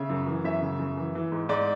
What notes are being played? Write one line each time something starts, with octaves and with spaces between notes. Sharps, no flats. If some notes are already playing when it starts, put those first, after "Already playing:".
Already playing: C#3 E5
F#2
E3
F#2 E5
C#3
F#2
E3
E3
G#2
G#2 D5